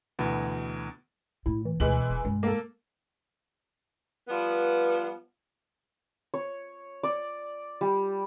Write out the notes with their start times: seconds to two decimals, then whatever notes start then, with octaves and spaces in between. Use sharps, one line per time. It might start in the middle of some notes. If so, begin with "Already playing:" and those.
0.19 D2 B2 E3
1.46 A2 E4
1.65 E3
1.80 D2 B2 E3 G#3 F#7
2.09 E1
2.25 G2 G#3
2.43 A#3 A4
4.28 F3 G3 B3
6.34 C#5
7.03 D5
7.81 G3